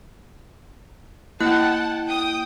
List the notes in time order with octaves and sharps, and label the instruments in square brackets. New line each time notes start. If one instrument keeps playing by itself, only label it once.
[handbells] A#3 E4 F#6 [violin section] F#5 G5 A5
[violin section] G5 D#6